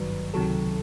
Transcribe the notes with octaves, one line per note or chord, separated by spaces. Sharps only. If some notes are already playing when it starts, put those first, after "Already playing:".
Already playing: G#1 G2 D#3 F#3 B4
C#2 C3 D#3 F#3 A4